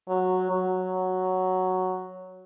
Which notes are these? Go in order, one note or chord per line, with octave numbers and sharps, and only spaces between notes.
F#3
F#3